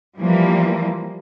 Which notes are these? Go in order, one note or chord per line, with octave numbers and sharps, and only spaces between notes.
E3 F3 G3 A#3